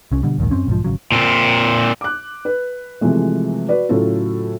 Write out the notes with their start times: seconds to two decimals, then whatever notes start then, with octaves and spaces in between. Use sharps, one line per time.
0.12 C2 C#4
0.23 B2 D3 G3
0.38 A#1 D#2 G#2 D#3
0.51 F#2 C4 C#4
0.67 B1 G#2 F3
0.84 G#1 C#3 F#3
1.12 A#2 C4
2.01 D6 F#6
2.45 B4
3.01 C3 E3 F3 G#3 A3
3.69 F#4 B4 D5
3.89 A2 C#3 F#3 F4 A4